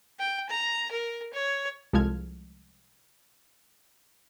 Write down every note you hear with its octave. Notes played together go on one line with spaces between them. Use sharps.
G5
A#5
A#4
C#5
C2 F3 G#3 A4 F6 G#6